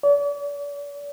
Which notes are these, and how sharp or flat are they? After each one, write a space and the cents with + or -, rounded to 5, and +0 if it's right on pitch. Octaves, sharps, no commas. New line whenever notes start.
D5 -45